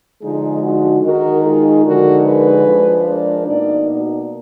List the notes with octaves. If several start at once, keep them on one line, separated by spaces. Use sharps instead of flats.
D3 F3 G#3 D#4 F4 G#4
D#4 F#4
D#3 G#3 D#4 F#4 A#4
F4 G#4
D3 F3 G#3 D#4 F#4 A#4
G#4 B4
F3 G#3 D4
A#4 D5
B2 A#3 D#4 A#4 D5
F#4 A#4